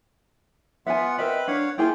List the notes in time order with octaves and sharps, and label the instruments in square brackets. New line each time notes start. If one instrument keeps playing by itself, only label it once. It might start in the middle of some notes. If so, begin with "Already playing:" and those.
[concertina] B3 F4 F#5 [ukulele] E5 G#5
[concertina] C4 B4 B5 [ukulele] A#4 D#5 E5
[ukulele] D4 [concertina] C#5 F5 F#5
[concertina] A#3 F4 G5 [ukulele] E4 G#4 G#5